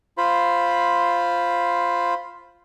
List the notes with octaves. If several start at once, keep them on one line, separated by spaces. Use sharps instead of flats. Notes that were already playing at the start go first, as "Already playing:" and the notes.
F4 C5 B5